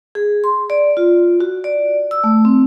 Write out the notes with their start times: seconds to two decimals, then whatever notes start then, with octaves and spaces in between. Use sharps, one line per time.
0.15 G#4
0.44 C6
0.70 D5
0.97 F4
1.40 F#4
1.64 D5
2.11 E6
2.24 A3
2.45 C4